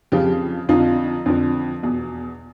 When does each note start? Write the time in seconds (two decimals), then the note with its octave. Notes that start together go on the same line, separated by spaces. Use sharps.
0.12 F2 C#3 F3 F4 G4
0.69 F2 D3 F3 D#4 F4
1.26 F2 D3 F3
1.83 E2 B2